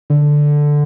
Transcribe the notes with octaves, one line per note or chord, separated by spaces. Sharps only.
D3